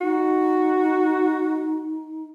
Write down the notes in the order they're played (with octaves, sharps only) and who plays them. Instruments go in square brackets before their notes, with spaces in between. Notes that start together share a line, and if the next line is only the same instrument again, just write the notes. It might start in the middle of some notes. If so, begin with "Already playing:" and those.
[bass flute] D#4 [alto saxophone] F#4